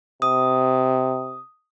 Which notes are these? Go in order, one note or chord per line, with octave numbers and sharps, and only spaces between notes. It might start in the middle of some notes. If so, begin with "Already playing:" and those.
C3 D#6